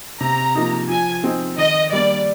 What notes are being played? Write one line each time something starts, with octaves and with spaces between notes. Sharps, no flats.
C3 A#5
F3 A#3 D#4
F3 G#5
C4 D#4
D#3 D#5
G3 A#3 D4 D5